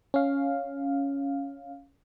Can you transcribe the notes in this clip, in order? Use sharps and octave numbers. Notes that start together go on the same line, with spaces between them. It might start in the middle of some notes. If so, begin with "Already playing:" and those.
C#4 F5